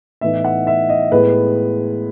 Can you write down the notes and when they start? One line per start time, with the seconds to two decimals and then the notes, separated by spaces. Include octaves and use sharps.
0.21 A2 E3 B3 D#4 E5
0.45 F#5
0.67 E5
0.89 D#5
1.12 A2 G#3 B3 B4